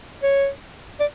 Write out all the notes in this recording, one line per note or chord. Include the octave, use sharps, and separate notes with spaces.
C#5
D5